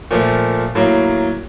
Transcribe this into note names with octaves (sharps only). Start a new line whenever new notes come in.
A#2 F3 A3
A2 F#3 A#3